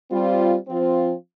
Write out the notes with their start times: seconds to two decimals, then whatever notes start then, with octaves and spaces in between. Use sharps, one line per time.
0.10 G3 C4 F4
0.68 F3 C4 F4